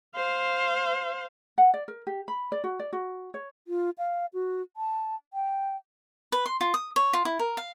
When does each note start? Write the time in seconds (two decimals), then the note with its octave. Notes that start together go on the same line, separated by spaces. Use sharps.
0.16 C5 F5
1.58 F#5
1.74 D5
1.88 A#4
2.07 G4
2.28 B5
2.52 D5
2.64 F#4
2.80 D5
2.93 F#4
3.34 C#5
3.68 F4
3.98 F5
4.34 F#4
4.77 A5
5.33 G5
6.32 B4
6.46 C6
6.61 F4
6.74 D#6
6.96 C#5
7.13 F4
7.25 E4
7.39 A#4
7.57 F5